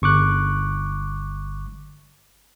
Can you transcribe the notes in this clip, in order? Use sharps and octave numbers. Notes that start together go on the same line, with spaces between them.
G1 C#6 D6 F#6